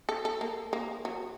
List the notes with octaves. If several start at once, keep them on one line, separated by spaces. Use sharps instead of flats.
A4
A4
A#3
A#3
F#3